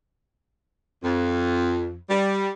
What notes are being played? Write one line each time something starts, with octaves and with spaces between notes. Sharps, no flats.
F2
G3